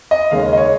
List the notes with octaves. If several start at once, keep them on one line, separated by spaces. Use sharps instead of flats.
D#5
D#2 C#3 G#3 C#4 F5
D#5
C#5